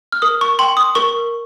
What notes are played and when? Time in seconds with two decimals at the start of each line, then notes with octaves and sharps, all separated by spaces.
0.12 F6
0.22 A#4 D#6
0.41 C#6
0.59 G5 C6
0.77 D#6
0.95 A#4 C#6